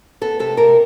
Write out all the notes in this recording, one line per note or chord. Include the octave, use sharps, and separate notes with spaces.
B3 A4
C3 A4
C3 A#4